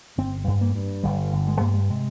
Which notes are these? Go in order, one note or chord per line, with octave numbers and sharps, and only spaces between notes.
G1 C4
G2
A#3
G2
G1 G3
G1
G#3
G2 A#3
G#3
C3 G#3